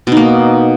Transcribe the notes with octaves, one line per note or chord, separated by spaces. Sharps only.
B2 A#3 D#4